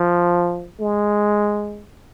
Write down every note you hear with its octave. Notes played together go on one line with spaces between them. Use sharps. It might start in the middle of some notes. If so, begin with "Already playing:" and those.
Already playing: F3
G#3